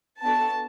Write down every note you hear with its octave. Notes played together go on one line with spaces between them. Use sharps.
B3 D4 F#4 A4 A5